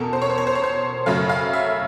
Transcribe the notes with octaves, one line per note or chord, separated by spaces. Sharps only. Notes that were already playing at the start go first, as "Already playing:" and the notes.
Already playing: E2 B2 A4 A#4
C5
C#5
C5
C#5
C5
C#5
C5
F#2 C#3 F#3 A3 F5
F5
E5